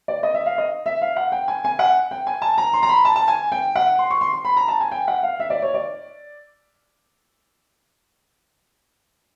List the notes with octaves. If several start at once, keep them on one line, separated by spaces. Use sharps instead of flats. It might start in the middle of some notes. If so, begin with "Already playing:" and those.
D5
D#5
E5
F5
D#5
E5
F5
F#5
G5
G#5
G#5
F#5
G5
G#5
A5
A#5
C6
A#5
B5
A5
A5
G#5
G5
F#5
C6
C#6
C6
C6
B5
A#5
A5
G#5
G5
F#5
F5
E5
D5
C#5
D5